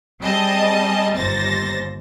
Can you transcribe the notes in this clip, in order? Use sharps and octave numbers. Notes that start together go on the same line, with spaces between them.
G3 C4 G#4 D#5 A5
G1 D#2 C5 A6 A#6